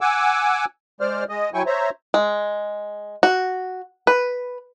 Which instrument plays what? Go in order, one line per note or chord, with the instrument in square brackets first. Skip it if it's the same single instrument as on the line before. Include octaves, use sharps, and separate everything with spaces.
[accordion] F#5 G#5 D6 E6
G#3 C5 D5 F6
G#3 D#5
F#3 E4 G5 G#5 C#6
C5 C#5 E5 A#5
[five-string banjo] G#3
F#4
B4